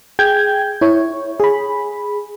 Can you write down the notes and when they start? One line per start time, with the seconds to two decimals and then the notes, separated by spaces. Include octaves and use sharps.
0.19 G#4 G5 G6 G#6
0.81 E4 C#5
1.40 G#4 B5